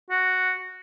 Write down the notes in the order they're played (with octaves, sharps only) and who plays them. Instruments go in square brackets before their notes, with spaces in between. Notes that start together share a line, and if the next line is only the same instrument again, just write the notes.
[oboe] F#4